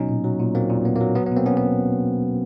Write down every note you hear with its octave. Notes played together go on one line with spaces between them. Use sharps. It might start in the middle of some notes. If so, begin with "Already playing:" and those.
Already playing: B2 F#3 C#4 D#4
A#2
F#3
A#2
F#3 A#3 C4
A#2
A#2 B3
A#3
F#3
F#3 B3
B3
B2
A#3 C4
F#3 B3 C#4
B3